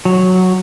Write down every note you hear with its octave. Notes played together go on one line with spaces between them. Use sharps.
F#3